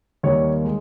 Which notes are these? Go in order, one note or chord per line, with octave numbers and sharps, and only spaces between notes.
D#2 D#3 G3 C#5
G#3